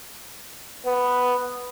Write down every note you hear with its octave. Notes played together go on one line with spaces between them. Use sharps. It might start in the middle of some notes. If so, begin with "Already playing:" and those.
B3